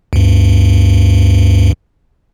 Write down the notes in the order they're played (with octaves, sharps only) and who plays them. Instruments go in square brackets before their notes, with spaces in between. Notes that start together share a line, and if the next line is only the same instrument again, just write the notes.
[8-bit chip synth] D2 G2